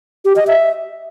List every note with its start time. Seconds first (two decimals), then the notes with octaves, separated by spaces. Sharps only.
0.25 G4
0.36 D#5
0.47 E5